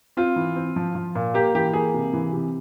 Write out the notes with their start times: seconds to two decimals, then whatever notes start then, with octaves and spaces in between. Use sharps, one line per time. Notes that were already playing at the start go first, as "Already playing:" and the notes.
0.17 C4 F4
0.36 E3
0.56 C4
0.76 F3
0.95 F3
1.15 A#2
1.34 A#3 G4
1.55 E3 G4
1.73 A#3 G#4
1.94 C3
2.13 E3
2.33 C3